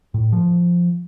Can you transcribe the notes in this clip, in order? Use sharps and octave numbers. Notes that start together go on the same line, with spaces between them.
A2
F3